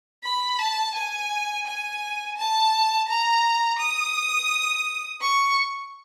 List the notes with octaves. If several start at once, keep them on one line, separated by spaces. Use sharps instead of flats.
B5
A5
G#5
G#5
A5
A#5
D#6
C#6